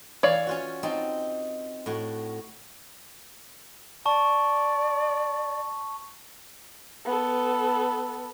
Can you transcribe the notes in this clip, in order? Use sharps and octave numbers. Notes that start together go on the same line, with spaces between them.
E3 C#5 D5 F5
C#4 F4 F#4
C4 D#4 A5
A2 F#4
D5 A5 C#6
B3 A4